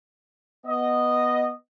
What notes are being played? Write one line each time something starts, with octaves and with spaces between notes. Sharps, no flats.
B3 D#5